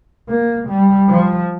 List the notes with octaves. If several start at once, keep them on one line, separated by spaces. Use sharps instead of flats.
A#3
G3
F3